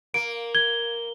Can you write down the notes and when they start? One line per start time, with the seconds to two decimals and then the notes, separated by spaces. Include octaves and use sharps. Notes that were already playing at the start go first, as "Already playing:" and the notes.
0.14 A#3 D7
0.55 G#6 G7